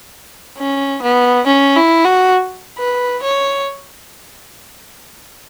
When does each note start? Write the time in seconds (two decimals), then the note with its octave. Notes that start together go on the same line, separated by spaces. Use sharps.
0.58 C#4
1.03 B3
1.46 C#4
1.76 E4
2.05 F#4
2.79 B4
3.23 C#5